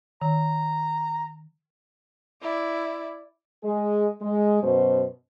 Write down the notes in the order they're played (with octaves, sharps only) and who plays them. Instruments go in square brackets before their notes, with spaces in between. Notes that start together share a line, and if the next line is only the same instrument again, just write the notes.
[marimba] D#3 [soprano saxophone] A#5
[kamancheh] E4 D5
[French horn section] G#3 G#4
G#3
F#2 B2 C5